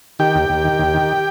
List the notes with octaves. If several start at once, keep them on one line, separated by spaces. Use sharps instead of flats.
D#3 G4 G5
D#2
D#2
D#3
D#2
D#3